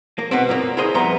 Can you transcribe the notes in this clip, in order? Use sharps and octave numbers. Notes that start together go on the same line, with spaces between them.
A#3
B2 B3 C4
F#2 A#2 A#3
E4 G#4 A#4 C5 D#5
F2 G3 B3 E5 A#5 C6